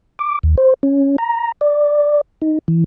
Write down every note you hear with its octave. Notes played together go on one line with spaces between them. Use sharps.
D6
D#2
C5
C#4
A#5
D5
D#4
E3